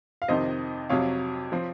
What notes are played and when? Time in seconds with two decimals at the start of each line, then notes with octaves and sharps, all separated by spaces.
0.22 F5
0.28 F2 C3 D#3 C5 D#5
0.89 F2 C3 F#3 C#5 F5
1.52 F3 C4